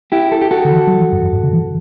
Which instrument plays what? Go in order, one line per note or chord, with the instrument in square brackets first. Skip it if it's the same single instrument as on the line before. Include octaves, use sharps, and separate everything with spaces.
[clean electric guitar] E4 G4
A4
G4
F#4 A4
[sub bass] D3
E3
F#3
E3
F#2
F#2
G2
C#3
E3